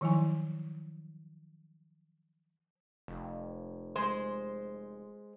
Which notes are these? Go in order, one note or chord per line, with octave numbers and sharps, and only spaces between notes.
D#3 F3 F#3 E4 G#5
F1
G#3 C5